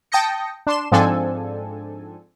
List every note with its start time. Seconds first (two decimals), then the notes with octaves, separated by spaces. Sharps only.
0.12 G5 A5 D#6 G6 A#6 C#7
0.67 D4 C6 E7
0.92 G#2 F3 C4 D4 A4 G#5